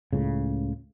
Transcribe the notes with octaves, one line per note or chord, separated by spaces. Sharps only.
C#2 A2 C#3